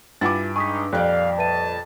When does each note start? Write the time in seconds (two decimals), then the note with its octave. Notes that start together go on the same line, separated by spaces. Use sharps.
0.21 G2 E4 F4 F#5 G#5 D6 A6
0.56 G#3 D#4 G#5 C#6 D#6 B6
0.93 F2 A#2 G3 D5 F5 F#6
1.38 B4 E5 A5 D#7